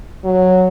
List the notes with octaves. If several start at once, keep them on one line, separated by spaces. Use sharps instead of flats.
F#3